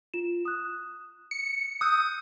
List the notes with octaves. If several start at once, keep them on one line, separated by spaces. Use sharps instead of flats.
F4 E7
D#6 F#6
C#7
D#6 E6 F#6 G6